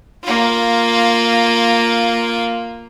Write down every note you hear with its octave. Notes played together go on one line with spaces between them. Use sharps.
A#3 F4